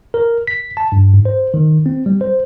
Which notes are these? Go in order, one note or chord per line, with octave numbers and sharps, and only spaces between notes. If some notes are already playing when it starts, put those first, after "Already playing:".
A#4
B6
A5
G2
G#2
C5
D#3
C4
G3
C5